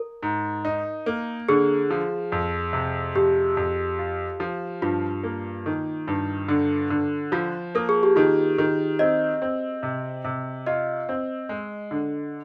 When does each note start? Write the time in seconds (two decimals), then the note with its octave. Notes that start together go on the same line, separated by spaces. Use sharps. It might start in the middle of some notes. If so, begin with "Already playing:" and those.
Already playing: A#4
0.22 G#2
0.65 D#4
1.06 A#3
1.49 D3 G#4
1.90 F3
2.32 F2
2.73 C3
3.15 F2 G4
3.57 F2
3.99 F4
4.40 F3
4.82 G2 F4
5.23 A#3
5.66 D#3
6.07 G2
6.48 D3
6.90 D3
7.32 F3 F4
7.75 A#3 A#4
7.89 G#4
8.03 G4
8.16 D#3 F4
8.58 D#3
8.99 C4 D#5
9.42 C4
9.83 C3
10.24 C3
10.67 F4 D#5
11.09 C4
11.49 G#3
11.91 D3